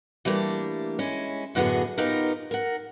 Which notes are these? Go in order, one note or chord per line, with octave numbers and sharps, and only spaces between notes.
E3 G3 A3 A#3 D4
G#3 C#4 E4
F#2 A2 D3 B3 F#4 G#4
B3 D#4 F4 G4 A#4
A#4 F#5